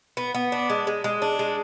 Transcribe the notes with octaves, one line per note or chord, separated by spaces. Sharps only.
B3
B3
D4
G#3
G#3
G#3
D4
G#3